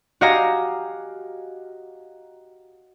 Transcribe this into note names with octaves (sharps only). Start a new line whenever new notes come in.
F#4 G4 D#5 F5 G#5 A#5